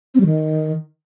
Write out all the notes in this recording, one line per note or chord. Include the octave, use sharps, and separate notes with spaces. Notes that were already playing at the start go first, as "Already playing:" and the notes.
C4
G3
D#3